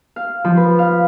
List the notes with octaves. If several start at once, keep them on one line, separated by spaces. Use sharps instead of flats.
F5
F3
B4
F5